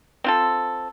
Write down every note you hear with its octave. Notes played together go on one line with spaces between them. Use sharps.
C4 F4 A4